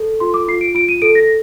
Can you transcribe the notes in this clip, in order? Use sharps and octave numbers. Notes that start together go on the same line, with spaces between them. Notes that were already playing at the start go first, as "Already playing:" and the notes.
Already playing: A4
F4 C6
D6
F4 C7
D7
F4 D7
D#7
A4 D7
A#6